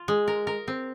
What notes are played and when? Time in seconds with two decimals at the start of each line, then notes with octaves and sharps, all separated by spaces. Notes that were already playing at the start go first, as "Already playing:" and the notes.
Already playing: F4
0.08 G#3
0.28 A#4
0.47 A#4
0.68 C4